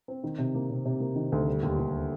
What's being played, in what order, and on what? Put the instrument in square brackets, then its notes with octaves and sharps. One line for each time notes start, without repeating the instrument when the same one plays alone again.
[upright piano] C4
D#3
C3
A#3
C3
C3
A#3
D#3
D2
G3
D#2
D#2